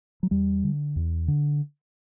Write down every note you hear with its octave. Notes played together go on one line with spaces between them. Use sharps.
F#3
E2 G3
D3
E2
D3